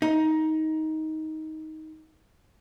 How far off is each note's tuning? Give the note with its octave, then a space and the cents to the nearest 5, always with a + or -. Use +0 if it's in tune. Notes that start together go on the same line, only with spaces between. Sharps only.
D#4 +15